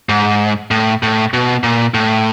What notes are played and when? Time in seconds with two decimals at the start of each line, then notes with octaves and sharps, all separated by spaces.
0.09 G#2
0.71 A2
1.03 A2
1.34 B2
1.63 A#2
1.94 A2